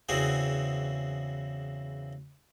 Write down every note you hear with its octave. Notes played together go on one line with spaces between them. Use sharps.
E2 C#3 E3 C4 F#4 G#4